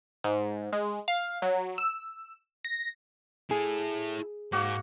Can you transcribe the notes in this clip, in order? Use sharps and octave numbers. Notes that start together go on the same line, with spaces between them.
G#2
G#3
F5
F#3
E6
A#6
E4 G#4 A4
G#2 A#3 F#4 F#5